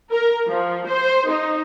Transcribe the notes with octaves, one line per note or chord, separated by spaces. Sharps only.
A#4
F3
C5
D#4